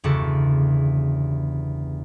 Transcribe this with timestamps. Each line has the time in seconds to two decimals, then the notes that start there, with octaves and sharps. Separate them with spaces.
0.04 G1 E2 C#3 F#4 A4 D6